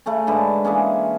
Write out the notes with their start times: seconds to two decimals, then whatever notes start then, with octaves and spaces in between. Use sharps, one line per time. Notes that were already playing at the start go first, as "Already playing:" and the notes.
0.06 C#3 A3 C#4
0.27 G#2 D3 B4 A5
0.65 E3 G#3 A#3 C#4